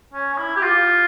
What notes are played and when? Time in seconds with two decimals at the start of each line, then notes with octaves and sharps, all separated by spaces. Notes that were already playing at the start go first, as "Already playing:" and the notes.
0.13 C#4
0.33 C#4
0.38 E4
0.56 G4
0.62 F4